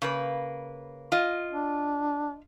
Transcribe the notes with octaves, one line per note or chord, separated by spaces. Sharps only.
C#3 A#3 B4
F4 D#5
D4